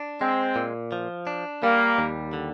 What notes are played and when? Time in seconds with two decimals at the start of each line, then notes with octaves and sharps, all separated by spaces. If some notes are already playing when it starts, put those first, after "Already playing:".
Already playing: D4
0.21 G#3 C4
0.56 A#2
0.92 F3
1.27 D4
1.63 G3 A#3
1.98 D#2
2.33 D3